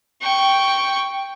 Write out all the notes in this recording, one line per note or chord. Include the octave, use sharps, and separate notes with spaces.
G5 C#6